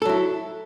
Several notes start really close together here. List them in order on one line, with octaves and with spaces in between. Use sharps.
A4 F#3 E4